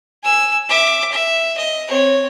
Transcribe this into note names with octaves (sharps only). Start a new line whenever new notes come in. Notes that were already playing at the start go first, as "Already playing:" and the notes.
G#5 E6
E5 D6
E5
D#5
C4 C#5